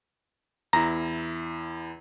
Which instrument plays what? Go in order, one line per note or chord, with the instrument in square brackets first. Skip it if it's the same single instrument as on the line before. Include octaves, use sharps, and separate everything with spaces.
[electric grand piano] E2 E4 [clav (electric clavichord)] A#5